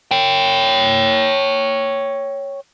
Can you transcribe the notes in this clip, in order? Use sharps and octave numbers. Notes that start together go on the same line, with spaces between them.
C#5 G5